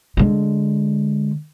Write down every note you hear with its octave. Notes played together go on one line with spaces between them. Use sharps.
D3 G#3